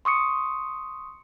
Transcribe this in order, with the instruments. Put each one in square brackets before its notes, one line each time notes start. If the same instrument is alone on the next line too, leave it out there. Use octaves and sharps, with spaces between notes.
[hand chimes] C6 C#6 D#6 C#7